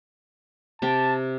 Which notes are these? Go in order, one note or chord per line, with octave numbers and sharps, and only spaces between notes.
C3 G4 G5 A5